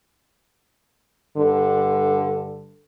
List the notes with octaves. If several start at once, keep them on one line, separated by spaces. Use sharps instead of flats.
G2 D3 A4